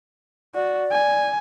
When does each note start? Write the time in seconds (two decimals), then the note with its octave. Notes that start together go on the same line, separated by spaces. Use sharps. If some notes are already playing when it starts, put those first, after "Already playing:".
0.55 F#4 D5
0.92 G#5